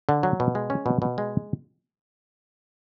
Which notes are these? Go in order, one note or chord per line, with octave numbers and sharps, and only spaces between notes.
D3
F#3
B2
G#3
C#4
B2
B2
G#3